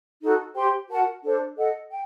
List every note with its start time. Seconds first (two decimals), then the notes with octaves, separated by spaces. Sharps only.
0.21 D#4 F#4 A4
0.55 G4 C5 G5 C6
0.88 F#4 A#4 F#5 A5
1.22 D4 A4 C5
1.56 A4 D#5 F#5
1.90 G5